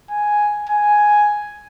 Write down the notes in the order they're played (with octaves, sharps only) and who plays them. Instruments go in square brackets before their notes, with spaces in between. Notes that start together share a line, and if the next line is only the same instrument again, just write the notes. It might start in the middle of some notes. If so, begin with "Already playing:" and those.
[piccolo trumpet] G#5
G#5